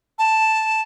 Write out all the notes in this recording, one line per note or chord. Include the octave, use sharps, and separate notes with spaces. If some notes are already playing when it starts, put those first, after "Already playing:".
A5